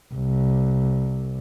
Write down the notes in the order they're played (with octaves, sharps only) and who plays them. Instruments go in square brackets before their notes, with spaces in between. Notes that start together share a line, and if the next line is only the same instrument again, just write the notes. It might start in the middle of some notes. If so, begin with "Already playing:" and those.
[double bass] C2